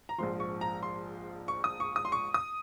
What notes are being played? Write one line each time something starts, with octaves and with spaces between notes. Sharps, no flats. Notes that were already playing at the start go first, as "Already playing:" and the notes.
A#5
A#1 G#2 F3 C6
C#6
A#5
C6
C#6
D#6
C#6
D#6
C6
C#6
D#6